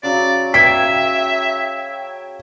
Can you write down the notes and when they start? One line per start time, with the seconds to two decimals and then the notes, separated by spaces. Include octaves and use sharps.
0.03 C#3 F#3 F#4 D5
0.54 E5 G5 G#6 B6